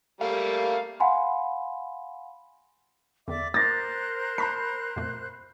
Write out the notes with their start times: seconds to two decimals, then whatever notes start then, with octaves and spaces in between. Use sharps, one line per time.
0.21 G3 A3 A#3 F5
1.00 F5 F#5 G#5 B5 C6
3.28 E2 D3 D5 E5 D6
3.54 A#4 C5 D6 F#6 A6 A#6
4.38 A5 B5 C6 B6
4.96 F2 A#2 A3